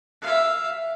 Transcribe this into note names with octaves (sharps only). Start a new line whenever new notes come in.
E5 F5